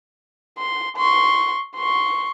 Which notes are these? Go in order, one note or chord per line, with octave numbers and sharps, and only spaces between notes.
C6
C6 C#6
C6 C#6